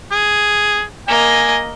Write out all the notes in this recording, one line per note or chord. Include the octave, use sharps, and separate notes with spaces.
G#4
A#3 D#5 G#5